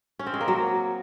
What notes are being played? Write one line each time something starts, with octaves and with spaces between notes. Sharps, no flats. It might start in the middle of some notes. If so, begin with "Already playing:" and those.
C#4
C4
G#3
A#3
F#3